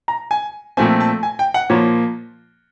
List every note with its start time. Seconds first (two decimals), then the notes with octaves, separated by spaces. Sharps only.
0.08 A#5
0.31 G#5
0.77 A#2 F3 A3 C4 G#5
1.00 A5
1.23 G#5
1.39 G5
1.54 F#5
1.70 A#2 F3 A#3 C#5